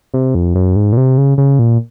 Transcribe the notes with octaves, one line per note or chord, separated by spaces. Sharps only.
C3
F2
F#2
G#2
A#2
C3
C#3
C#3
A#2